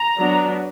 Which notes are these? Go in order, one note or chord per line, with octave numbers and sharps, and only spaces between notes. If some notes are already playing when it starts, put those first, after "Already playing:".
Already playing: A#5
F#3 B3 D4